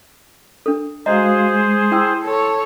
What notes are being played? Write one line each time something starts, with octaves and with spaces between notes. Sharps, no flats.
D4 A4
G#3 F#4 G#4 C5 D#5 F5 A#5
G#3
E4 G5 C6 E6
A4 C#5